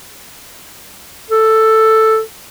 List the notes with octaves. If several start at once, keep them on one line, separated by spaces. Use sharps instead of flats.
A4